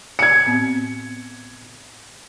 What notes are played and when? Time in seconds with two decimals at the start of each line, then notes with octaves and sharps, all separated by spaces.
0.19 G#6 C#7
0.46 A2 B3 C4